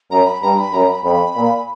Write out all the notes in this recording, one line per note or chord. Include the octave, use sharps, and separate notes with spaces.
F#2 A#5
B5
G2 A#5
B5
F#2 A#5
B5
F2 B5
A#2